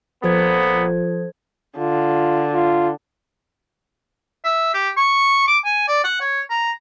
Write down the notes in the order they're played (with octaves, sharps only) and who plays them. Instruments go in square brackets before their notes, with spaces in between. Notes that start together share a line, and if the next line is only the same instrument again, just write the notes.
[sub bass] D#1 [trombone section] A#2 B3 [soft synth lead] F3 [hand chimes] A4 C5 G#6
[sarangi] D3 [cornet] F4
[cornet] F4
[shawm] E5
G4
C#6
D6
G#5
D5
F#5
C#5
A#5